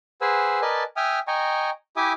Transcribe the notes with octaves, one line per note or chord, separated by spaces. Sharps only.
G#4 B4 C5 F#5 G#5 E6
A#4 B4 D5 D#5 G#5 A5
E5 G5 G#5 D#6 F6
D#5 G5 G#5 A#5 C#6
E4 G4 E5 G#5 D6 D#6